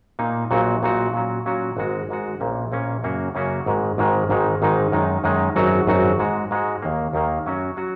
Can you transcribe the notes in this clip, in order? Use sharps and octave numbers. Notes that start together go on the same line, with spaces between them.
A#2 A#3 D#4
A#1 A#2 F#3 D#4 F#4
A#1 A#2 F#3 D#4 F#4
A#2 F#3 C#4 F#4
A#2 F#3 C#4 F#4
G#1 G#2 G#3 F#4
G#1 G#2 G#3 F#4
A#1 A#2 A#3 C#4
A#1 A#2 A#3 C#4
F#2 C#3 A#3 C#4 F#4
F#2 C#3 A#3 C#4 F#4
G#1 G#2 D#3 G#3
G#1 G#2 D#3 G#3
G#1 G#2 D#3 G#3 D#4
G#1 G#2 D#3 G#3 D#4
F#2 D#3 G#3 D#4
F#2 D#3 G#3 D#4
G#1 F#2 F#3 D#4 F#4
G#1 F#2 F#3 D#4 F#4
G#2 G#3 F#4
G#2 G#3 F#4
D#2 D#3 A#3
D#2 D#3 A#3
F#2 F#3 C#4 F#4
F#3 C#4 F#4